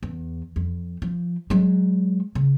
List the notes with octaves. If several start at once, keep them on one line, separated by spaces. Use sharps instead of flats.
E2
F2
F3
F#3 G#3
C#3